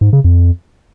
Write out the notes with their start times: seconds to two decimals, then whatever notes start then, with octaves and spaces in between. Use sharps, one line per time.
0.01 G#2
0.13 C#3
0.24 F2